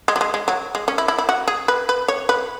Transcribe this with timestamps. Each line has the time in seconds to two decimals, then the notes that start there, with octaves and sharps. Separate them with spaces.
0.08 G#3
0.16 F#3
0.21 G#3
0.34 G#3
0.48 F#3
0.75 G#3
0.88 C#4
0.98 E4
1.08 E4
1.18 E4
1.29 F#4
1.48 G#4
1.68 B4
1.89 B4
2.08 C#5
2.29 B4